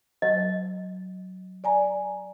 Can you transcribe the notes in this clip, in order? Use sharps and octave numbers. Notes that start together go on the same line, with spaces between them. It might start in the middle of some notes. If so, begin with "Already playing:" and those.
F#3 D#5
D5 G#5 A#5